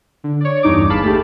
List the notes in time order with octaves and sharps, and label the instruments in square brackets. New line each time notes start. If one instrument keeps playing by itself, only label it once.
[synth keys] D3
C#5 D5
E2 G2 D#4 D6
G1 G#4 F5 A5 B5
A3 G4